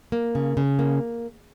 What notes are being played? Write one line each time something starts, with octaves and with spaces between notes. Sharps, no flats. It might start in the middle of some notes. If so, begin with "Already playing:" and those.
A#3
C#3
C#3
A#3